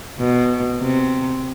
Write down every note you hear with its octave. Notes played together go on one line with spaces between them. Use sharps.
B2
C3